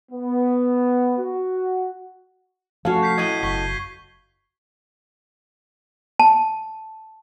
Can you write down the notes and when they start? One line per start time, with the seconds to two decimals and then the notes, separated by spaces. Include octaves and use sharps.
0.12 B3
1.18 F#4
2.85 F3 A3 C#4 F#4 A4 F5
3.03 G6 B6 C7
3.18 F#2 A2 D#5 G#6 D#7 G7
3.43 F#1 C#6 B6 G7
6.19 A5